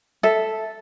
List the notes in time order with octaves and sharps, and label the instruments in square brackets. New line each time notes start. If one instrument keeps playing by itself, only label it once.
[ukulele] A4 E5